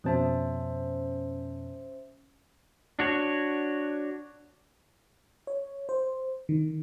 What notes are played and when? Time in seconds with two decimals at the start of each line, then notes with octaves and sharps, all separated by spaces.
0.04 F2 B2 C#4 C5 E5 A5
2.99 D4 F#4 C#5
5.47 C#5
5.89 C5
6.49 D#3